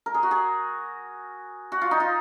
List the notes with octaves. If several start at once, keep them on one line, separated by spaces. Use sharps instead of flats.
A#4
G#4
F#4
G#4
F#4
F4
D#4
F4